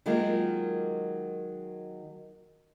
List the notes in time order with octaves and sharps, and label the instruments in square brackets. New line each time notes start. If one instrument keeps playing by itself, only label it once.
[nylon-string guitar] D#3 F#3 G#3 A#3 F4 A#4